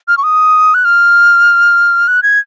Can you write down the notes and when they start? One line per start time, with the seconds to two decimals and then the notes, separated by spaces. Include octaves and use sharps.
0.08 F6
0.17 C#6
0.23 D#6
0.74 F#6
0.85 F6
2.08 F#6
2.23 G#6